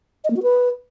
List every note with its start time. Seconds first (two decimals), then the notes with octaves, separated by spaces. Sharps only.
0.24 D#5
0.30 A#3
0.37 F#4
0.43 B4